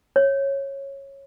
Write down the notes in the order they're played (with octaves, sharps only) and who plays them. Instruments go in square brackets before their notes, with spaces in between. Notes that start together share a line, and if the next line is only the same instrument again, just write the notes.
[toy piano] C#5